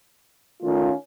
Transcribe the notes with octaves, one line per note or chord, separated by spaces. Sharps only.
D#3 A3 C#4 F4